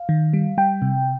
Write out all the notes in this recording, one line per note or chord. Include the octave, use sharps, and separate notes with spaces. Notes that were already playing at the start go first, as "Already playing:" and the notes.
Already playing: F5
D#3
G3
G3 G5
C3